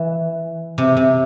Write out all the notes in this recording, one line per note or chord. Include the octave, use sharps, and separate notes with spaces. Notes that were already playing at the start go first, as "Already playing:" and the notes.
Already playing: E3
C3
C3